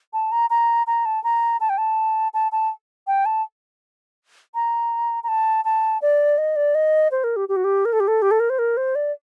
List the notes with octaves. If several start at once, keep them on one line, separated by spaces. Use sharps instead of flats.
A5
A#5
A#5
A#5
A5
A#5
A5
G5
A5
A5
A5
G5
A5
A#5
A#5
A5
A5
D5
D#5
D5
D#5
C5
A#4
G4
G4
F#4
G4
A#4
A4
G4
A4
G4
A4
A#4
C5
A#4
C5
D5